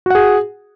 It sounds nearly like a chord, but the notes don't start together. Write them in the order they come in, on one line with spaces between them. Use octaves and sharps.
F#4 F#5 G#4